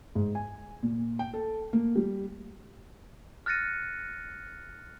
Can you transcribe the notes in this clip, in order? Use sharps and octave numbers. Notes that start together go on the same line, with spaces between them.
G#2
G#5
A#2
G5
A4
A#3
G3
F6 F#6 A6 A#6 C#7 D#7